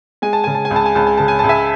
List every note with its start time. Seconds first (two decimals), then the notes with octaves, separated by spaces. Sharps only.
0.22 G#3 G#5
0.33 A5
0.44 C#3 G#5
0.55 A5
0.65 G#5
0.71 C#2
0.76 A5
0.86 G#5
0.95 C#2 A5
1.07 G#5
1.17 C#3 A5
1.28 G#5
1.39 C#2 A5
1.49 E5 G#5